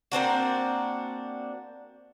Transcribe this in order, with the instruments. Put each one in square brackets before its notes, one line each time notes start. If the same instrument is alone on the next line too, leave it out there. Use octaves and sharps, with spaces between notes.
[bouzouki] A#3 C4 D4 F#4